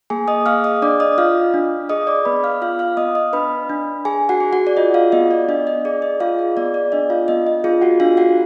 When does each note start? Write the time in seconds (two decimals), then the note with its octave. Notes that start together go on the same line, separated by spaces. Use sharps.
0.10 A#3 G#4 G#5
0.28 D#5 D#6
0.46 G#4 F5 F6
0.64 D#5 D#6
0.82 D4 D5 D6
1.00 D#5 D#6
1.18 F4 F5 F6
1.54 D4
1.89 G#4 D#5 D#6
2.07 D5 D6
2.25 B3 B4 B5
2.44 F5 F6
2.61 F4 F5 F6
2.79 F5 F6
2.97 B3 D#5 D#6
3.15 D#5 D#6
3.33 D4 B4 B5
3.69 D4
4.05 G#4 G#5
4.29 F#4 F#5
4.40 G#4
4.53 F#4 F#5
4.67 D5
4.77 F4 D#5
4.94 F4 F5
5.12 B3 D#5
5.31 D5
5.49 D4 D#5
5.67 D#5
5.85 G#4 D5
6.02 D#5
6.20 F4 G#4 F5
6.39 D#5
6.57 B3 D5
6.74 D5
6.92 D4 D#5
7.10 F4 F5
7.28 B3 D#5
7.47 D#5
7.64 F4 G#4 F5
7.81 F#4 F#5
8.00 D4 F4 F5
8.17 F#4 F#5